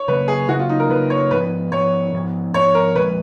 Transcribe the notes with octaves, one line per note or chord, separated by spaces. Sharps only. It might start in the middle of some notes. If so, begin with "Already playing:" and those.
Already playing: C#5
C#3 F#3 A#3 B4
G#4
C#3 F#3 A#3 F#4
F4
D#4
A#4
C#3 F#3 A#3 B4
C#5
G#2 F3 B3 B4
G#2 F3 B3 C#5
G#2 F3 B3
G#2 F3 B3 C#5
A#4
A#2 F3 G#3 B4